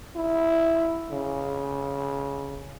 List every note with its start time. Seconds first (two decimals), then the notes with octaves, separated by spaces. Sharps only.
0.16 E4
1.11 C#3